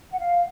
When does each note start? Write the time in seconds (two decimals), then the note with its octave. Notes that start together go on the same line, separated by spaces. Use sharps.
0.12 F#5
0.19 F5